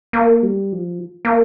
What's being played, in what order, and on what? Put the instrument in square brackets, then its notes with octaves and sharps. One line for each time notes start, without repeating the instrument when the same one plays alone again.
[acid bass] A#3
G3
F3
A#3